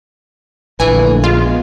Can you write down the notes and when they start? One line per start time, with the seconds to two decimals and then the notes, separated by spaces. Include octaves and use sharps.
0.80 A#1 D3 E3 A3 A#3 G#5
1.24 G#3 B3 F4